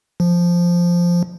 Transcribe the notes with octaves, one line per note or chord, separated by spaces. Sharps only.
F3